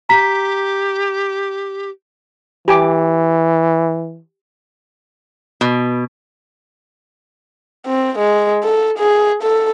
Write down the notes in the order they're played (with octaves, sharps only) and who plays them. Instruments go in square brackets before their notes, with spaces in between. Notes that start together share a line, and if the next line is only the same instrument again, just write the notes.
[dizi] G4 [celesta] A#5 B6
[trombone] E3 [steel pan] G4 G#5 D6
[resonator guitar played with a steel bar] B2
[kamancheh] C4
G#3
A4
G#4
A4